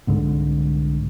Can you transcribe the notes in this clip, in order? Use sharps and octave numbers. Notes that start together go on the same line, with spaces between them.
C2 G#2 D3